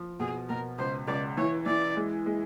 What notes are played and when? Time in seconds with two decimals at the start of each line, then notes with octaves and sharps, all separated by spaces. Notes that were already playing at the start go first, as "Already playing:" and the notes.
Already playing: F3
0.20 B2 G#4
0.49 B2 A#4
0.78 C#2 C5
1.07 C#2 D5
1.37 E3 C#5
1.66 E3 D5
1.97 G#3
2.26 G#3